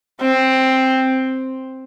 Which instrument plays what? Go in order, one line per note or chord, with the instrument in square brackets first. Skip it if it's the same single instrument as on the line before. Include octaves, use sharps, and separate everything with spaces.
[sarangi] C4